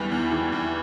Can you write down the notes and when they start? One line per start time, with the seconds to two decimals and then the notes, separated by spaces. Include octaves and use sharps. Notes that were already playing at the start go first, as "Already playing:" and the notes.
Already playing: E2 E3 G3
0.12 E2
0.32 E3
0.53 E2